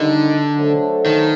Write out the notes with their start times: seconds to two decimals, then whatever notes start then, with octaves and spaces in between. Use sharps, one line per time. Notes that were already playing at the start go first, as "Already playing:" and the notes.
Already playing: D3 D#3 G3 A#3 D#4
0.57 F#3 A3 D4 A4 C5
1.06 D#3